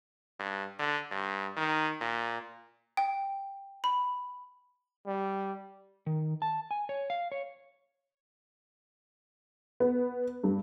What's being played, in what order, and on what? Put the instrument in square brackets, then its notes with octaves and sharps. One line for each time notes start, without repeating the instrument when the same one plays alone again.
[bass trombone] G2
D3
G2
D#3
A#2
[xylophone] G5
B5
[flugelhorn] G3
[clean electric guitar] D#3
A5
G#5
C#5
F5
C#5
[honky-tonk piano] B3
G2